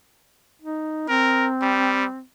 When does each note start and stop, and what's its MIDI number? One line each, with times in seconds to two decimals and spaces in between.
0.62 1.05 63
1.09 2.23 60
1.09 1.47 70
1.62 2.05 55